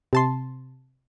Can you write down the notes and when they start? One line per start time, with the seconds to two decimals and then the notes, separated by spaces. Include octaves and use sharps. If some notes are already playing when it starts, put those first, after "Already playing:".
0.13 C3 A5 C6